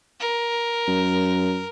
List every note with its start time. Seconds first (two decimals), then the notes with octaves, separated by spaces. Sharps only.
0.20 A#4
0.88 F#2